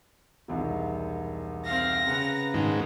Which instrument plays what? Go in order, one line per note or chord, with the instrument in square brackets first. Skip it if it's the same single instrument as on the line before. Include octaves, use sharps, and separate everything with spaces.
[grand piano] E1 C2 D#3
[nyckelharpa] C4 F5 [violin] A#6
[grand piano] C#3 F#5 [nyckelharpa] B4 A#5
[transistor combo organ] G#2 D#3